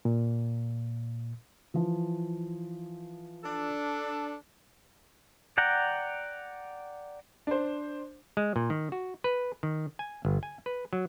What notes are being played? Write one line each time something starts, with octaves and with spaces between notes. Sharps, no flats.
A#2
E3 F3
D4 A4
D5 F#5 G5 A#5
D4 C5
G#3
A#2
D#3
F#4
B4
D#3
G#5
G1
G#5
B4
F#3